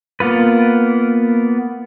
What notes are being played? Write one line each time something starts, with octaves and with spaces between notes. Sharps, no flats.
A#3 B3 F4 B4